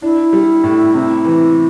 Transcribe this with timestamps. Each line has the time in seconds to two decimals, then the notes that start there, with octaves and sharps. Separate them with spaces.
0.02 D4 E4
0.33 G3
0.64 A2
0.94 C3
1.25 E3